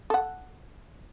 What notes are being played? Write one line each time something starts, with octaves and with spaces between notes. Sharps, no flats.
A4 F#5